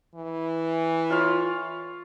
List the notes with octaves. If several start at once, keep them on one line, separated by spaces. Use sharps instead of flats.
E3
F4 C#5 F5